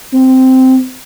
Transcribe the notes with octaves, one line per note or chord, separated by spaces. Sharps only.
C4